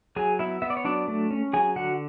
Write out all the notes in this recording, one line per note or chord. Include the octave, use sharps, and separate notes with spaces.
F#3 G#4 G#5
B3 E4 E5
B3 E5
D5
C#5
F#3 D4 D5
A3
C#4
F#3 G#4 G#5
D3 F#4 F#5